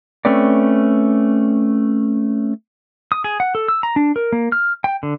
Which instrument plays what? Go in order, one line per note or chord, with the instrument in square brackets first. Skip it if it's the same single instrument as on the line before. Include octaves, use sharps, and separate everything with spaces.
[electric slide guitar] A3 C4 C#4 B4 D5
[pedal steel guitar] D#6
G#4
F#5
A4
E6
A#5
D4
A#4
A#3
F6
G5
D3